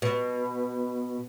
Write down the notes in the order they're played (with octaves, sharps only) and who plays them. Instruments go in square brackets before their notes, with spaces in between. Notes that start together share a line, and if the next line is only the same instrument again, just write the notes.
[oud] B2